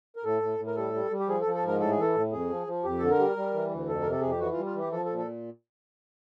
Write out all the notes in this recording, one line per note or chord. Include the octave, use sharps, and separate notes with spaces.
A#4
A2 A4
A2
A2
A#4
G3 A4
G3
G3
G4
F3 G#4
A4
F3
A4
G#2 A#4
A2 A4
G#4
E3 A4
A2
F2 G#4
F3
F3
F2 G4
D3 A4
A#4
G3
G3
E3
D2
F2 A4
C3 A#4
A4
F2 G#4
G4
E3 F#4
F4
G3
F4
E3 G4
F3 A4
A4
A#2
A4